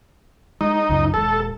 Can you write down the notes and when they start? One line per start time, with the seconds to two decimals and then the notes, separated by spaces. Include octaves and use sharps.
0.61 G#3 D#4
0.89 C#2 F#2 C#3
1.14 D#1 G#3 A4